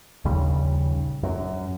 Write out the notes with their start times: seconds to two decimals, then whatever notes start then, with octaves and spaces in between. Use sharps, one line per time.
0.25 A#1 D#2 C#3 G3
1.23 F#2